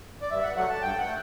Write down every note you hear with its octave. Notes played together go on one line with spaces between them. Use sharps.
D5
G2 E5
F#5
F#3 A3 F#5
A5
G2 G5
F#5
A3